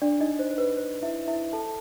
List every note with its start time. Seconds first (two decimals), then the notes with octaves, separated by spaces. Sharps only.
0.02 D4 D5
0.21 D#4 D#5
0.39 C5
0.51 C5
0.58 B4
0.77 C5
1.02 E4 E5
1.28 E4 E5
1.53 A4 A5